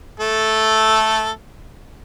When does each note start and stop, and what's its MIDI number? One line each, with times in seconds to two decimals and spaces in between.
0.20 1.30 57
0.20 1.30 69